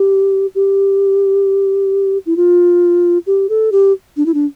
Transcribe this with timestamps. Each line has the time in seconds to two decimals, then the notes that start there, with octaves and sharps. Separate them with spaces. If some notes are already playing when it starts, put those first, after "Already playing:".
Already playing: G4
0.55 G4
2.26 E4
2.37 F4
3.27 G4
3.49 A4
3.72 G4
4.17 D4
4.26 E4
4.34 D4